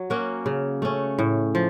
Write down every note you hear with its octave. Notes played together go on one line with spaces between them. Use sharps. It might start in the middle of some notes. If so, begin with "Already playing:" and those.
Already playing: F#3
A#3 C#4 F#4
C#3
A3 C#4
A2
F3